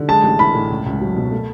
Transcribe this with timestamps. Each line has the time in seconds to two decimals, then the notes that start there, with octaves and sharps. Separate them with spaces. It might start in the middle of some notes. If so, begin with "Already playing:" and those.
Already playing: D3
0.08 G#3 A5
0.23 A1
0.39 E3 B5
0.54 A2
0.70 C#2
0.86 C#2
1.01 F#3
1.16 B2
1.32 A3